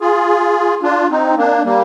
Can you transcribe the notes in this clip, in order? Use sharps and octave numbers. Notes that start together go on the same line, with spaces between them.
F4 G#4
D4 F4
C4 D#4
A#3 D4
G3 A#3